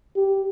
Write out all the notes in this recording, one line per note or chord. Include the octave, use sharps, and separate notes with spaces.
G4